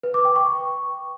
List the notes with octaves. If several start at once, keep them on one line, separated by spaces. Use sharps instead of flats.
B4
D6
G5
C#6